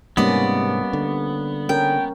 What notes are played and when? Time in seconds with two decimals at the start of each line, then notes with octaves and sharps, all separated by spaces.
0.17 G#2 C3 G3 A#3 B3 C#4 D5 D#5
0.93 D3
1.69 C#4 A#4 G5